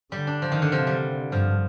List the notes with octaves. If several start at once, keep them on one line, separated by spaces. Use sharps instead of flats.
D3 G3
D4
F3
D#3
D3
C3 F3
G3
G2 F3